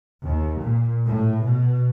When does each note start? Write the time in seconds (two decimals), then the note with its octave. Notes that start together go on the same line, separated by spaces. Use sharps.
0.23 D#2
0.61 A#2
1.05 A2
1.45 B2